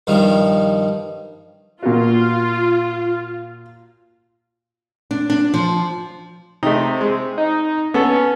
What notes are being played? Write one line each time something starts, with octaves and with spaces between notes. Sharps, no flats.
G2 D#3 F3 G3
A#2 F4 F#4
D4
D4
F3
C3 A3 D#4
G#3
D#4
B3 C#4 A4